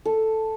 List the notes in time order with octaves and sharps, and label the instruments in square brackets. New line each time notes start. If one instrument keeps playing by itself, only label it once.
[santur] A4